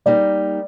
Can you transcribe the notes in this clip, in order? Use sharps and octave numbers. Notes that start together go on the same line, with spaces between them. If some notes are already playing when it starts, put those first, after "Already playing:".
G3 A#3 D#4 D5